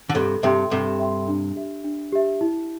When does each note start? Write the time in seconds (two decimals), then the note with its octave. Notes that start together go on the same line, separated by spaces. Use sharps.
0.09 D3
0.15 G2 C3 A4
0.43 G2 C3 E5 G5 C6
0.71 G2 C3 A4
0.99 E5 G5 C6
1.28 D4
1.56 G4 E5
1.84 D4
2.12 G4 E5
2.41 E4